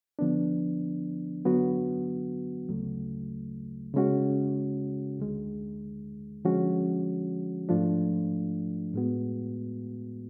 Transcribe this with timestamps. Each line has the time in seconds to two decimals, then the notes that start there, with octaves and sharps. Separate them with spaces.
0.19 D3 F3 B3 D4
1.45 D3 F#3 B3 F#4
2.69 D2 C#3 F#3 A3
3.94 C#3 G#3 C#4 F#4
5.19 D2 D3 G#3
6.44 D3 F3 G#3 C#4 F#4
7.69 G#2 F3 A3 D4 F4
8.94 A2 G#3 B3 F#4